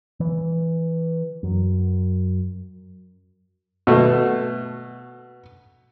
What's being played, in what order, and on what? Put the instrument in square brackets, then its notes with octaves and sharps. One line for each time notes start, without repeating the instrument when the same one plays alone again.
[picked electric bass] E3
F#2
[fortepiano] B2 A3